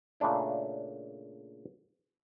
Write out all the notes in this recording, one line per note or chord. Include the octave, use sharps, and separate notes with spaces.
A#2 C#3 A3 D4 E4